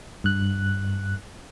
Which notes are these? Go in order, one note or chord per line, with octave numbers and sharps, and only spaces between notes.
G2 F#6